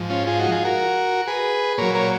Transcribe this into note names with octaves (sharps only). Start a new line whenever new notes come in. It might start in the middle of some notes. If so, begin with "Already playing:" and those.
Already playing: G#2 F3
C#4 F4
F4 G#4
D#4 F#4
F4 G#4
F#4 A#4
G#4 B4
A#2 F#3 A#4 C#5
A#4 C#5